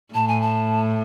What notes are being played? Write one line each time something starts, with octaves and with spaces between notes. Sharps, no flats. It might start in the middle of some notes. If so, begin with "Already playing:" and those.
A2 A5
G#5
A5